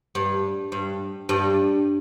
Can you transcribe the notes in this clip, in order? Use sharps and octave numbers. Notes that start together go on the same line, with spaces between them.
G2
G2
G2